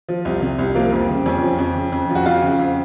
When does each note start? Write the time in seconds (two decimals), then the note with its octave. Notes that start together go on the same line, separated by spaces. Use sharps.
0.09 F3
0.25 C2
0.42 C3
0.59 C2
0.75 F3 A#3
0.92 F2
1.09 C#3
1.26 F2 C#4
1.42 F3
1.59 F2
1.76 C#3
1.92 F2
2.10 F3
2.15 F#4
2.26 F2 F4
2.42 C#3
2.59 F2